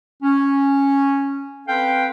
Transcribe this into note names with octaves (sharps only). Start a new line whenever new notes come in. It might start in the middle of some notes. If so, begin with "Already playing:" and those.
C#4
C4 A4 B4 F5 G5